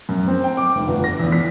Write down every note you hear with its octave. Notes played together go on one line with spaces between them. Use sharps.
F#2
C4
G5
D6
F1
G1
A#6
E2
B6